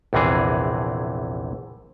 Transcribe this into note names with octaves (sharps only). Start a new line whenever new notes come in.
A#1 E2 C3 E3 G#4